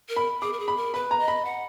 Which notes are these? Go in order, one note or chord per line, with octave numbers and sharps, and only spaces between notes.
A#4
B5
G#4 D6
A#4
G#4
B5
A#4
B4 B5
A#5
D#5
B5
F#5